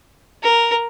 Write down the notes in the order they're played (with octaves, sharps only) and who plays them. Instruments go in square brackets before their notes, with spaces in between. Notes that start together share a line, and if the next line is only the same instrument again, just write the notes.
[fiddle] A#4